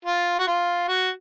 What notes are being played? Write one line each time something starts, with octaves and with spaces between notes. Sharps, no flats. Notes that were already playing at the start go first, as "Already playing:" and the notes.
F4
F#4
F4
F#4